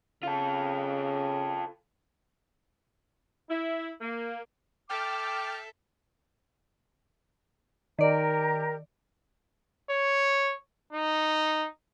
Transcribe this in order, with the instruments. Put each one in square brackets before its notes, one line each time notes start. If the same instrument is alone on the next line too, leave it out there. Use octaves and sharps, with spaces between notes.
[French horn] C#3 [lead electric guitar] F4 A4
[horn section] E4
A#3
[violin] A4 E5 [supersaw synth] G5 F6 A6 [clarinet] D6
[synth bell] D#3 D5 [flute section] G4 A#4 A#5
[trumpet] C#5
D#4